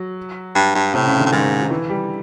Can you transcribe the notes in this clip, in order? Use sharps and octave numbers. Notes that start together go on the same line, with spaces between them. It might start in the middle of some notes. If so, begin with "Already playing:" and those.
Already playing: F#3
G2
G2
A2 C3
C#3
D3
A2
G#2 D#3
D#3
E3
G3